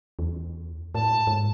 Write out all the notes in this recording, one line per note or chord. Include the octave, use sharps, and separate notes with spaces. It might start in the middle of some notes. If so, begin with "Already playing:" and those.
E2
A2 A5
G#2